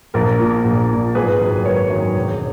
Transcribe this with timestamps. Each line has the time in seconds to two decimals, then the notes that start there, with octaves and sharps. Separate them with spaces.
0.14 A#1 A#4
0.39 A#2
0.64 A#1
0.89 A#2
1.15 G#1 G#4 B4
1.40 F#2 D#3
1.56 B4
1.65 G#1 A#4 C#5
1.90 F#2 D#3
2.15 E1